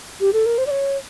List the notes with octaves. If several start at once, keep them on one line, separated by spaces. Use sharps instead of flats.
G4
A4
A#4
C5
D5
C#5